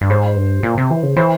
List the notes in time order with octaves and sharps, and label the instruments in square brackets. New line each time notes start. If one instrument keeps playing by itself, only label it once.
[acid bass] G2
[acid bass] G#2 [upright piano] C5
[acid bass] G2
A#2
C3
E3
C#3
[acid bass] E3 [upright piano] C5